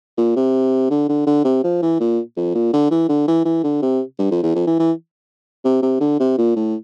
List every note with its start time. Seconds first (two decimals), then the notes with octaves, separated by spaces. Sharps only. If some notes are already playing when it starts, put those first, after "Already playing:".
0.18 A#2
0.36 C3
0.90 D3
1.09 D3
1.27 D3
1.44 C3
1.64 F3
1.82 E3
2.00 A#2
2.37 F2
2.55 A#2
2.73 D3
2.91 E3
3.09 D3
3.28 E3
3.45 E3
3.64 D3
3.82 C3
4.19 G2
4.31 F2
4.43 E2
4.55 F2
4.67 E3
4.79 E3
5.65 C3
5.82 C3
6.00 D3
6.20 C3
6.38 A#2
6.56 A2